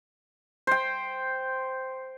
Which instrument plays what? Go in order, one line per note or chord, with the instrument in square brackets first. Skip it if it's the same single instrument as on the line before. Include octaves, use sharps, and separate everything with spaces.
[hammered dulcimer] C5 G5